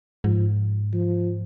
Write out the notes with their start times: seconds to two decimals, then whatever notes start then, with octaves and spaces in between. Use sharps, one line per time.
0.24 G#2 F3
0.93 F3